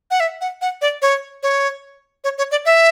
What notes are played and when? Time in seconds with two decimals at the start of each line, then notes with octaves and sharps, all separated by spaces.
0.11 F#5
0.20 E5
0.41 F#5
0.61 F#5
0.81 D5
1.02 C#5
1.43 C#5
2.24 C#5
2.38 C#5
2.51 D5
2.65 E5